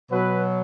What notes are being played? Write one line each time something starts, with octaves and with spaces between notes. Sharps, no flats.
B2 F#3 B4